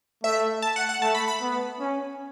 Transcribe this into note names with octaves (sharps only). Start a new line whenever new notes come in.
A3 E5
A5
F#5
F#5
A3 A5
B5
B5
B3
C#4